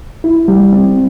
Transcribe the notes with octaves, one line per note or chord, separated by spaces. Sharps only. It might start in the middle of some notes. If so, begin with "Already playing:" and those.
E4
G3
C4